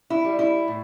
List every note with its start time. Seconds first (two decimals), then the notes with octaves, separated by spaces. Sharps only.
0.10 E4
0.24 G3
0.39 E4
0.68 A2